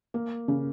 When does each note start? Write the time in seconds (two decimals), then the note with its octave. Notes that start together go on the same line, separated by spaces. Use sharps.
0.14 A#3
0.48 C#3